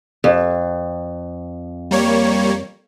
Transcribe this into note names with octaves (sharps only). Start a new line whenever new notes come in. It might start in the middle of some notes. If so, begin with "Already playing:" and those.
F2
G3 A#3 C#5